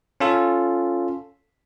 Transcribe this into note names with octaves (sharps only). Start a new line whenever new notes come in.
C#4 F4 A4